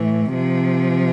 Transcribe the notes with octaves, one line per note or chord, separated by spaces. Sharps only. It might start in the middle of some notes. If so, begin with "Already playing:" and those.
Already playing: A2 E3
C3 F3